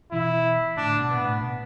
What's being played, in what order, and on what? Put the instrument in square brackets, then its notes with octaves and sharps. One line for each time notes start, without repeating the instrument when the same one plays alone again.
[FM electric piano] B2 E3 [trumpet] E4
[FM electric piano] A2 D3 [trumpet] D4
[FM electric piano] B2
[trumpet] B3
[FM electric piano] A2
B2